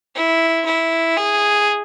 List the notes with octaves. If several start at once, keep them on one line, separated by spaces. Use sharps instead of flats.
E4
E4
G#4